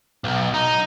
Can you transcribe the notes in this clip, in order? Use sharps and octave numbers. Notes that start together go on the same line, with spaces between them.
B1
D#4